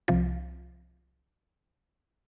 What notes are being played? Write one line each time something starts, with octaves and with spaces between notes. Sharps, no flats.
C2 F3